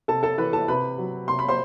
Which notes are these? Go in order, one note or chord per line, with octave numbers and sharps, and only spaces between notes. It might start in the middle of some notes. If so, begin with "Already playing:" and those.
C3 A4 A5
A4 A5
E3 B4 B5
A4 A5
C3 B4 B5
F#3
C3 C6
B5
C5 C6